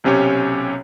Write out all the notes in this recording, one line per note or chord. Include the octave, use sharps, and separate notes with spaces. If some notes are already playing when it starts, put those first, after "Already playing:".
B1 C3 C#4 G4 C#5